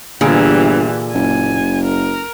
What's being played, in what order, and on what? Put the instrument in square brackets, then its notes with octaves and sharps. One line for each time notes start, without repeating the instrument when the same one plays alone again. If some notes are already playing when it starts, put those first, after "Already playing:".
[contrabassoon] G1 [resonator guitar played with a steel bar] A#2 D3 G#4 [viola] E3 G4
[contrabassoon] F#1 [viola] G#5
[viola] A#4